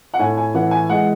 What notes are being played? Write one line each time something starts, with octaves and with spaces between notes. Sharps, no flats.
F#5
A2 G#5
G#5
E3 F#5
G#5
G#3 F#5